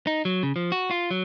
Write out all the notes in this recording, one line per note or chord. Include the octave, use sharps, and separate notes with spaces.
D#4
F#3
C#3
F3
F#4
F4
F#3